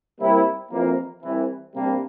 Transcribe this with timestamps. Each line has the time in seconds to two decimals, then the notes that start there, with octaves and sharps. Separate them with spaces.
0.19 C2 C3 G3 A#3 E4
0.70 F2 C3 E3 A#3
1.22 C2 C3 E3
1.73 C3 G3 A#3 D4